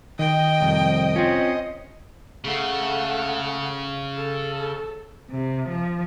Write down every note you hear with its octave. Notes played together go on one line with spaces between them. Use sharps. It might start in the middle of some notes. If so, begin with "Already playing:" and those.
D#3 D#5 G5
C2 F2
C4 C#4 F4
C#3 A3 F#5
A4
C3
F3